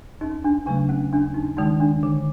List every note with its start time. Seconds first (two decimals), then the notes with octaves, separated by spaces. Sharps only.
0.21 D#2 D#4
0.44 D4
0.66 C#3 F#3 A3 D4
0.89 C#4
1.12 D#2 D4
1.34 D#4
1.57 D#3 G#3 D#4
1.80 D4
2.03 D3